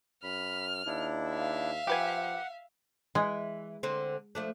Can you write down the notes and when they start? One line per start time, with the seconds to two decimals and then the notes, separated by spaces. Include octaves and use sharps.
0.24 F#2 B5 F6
0.86 D#2 D4 E4
1.30 E5 F5
1.87 F3 G4 B4 F#5 G#5
3.15 E3 G#3
3.83 D3 C4
4.35 F3 A3 D4